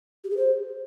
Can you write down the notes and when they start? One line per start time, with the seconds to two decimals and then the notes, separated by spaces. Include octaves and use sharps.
0.24 G4
0.30 G#4
0.37 C5